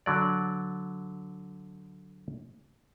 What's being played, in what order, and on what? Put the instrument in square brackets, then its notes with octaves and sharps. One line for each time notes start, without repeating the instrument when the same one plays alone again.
[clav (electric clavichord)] D3 F#3 D5